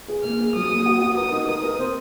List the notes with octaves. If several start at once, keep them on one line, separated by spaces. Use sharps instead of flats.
G#4
A#3 F6
G#4
F#3 D#6
A#3
F#4
F#4
A#4 D#6
D#4
A#4 D#6
A#4
C4